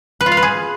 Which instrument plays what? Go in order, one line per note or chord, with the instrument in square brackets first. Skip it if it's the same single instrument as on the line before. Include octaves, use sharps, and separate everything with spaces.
[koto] B4
F4
F5
B4
G#4